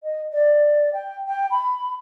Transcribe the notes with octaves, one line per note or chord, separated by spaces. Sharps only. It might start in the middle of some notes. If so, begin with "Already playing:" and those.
D#5
D5
G5
G5
B5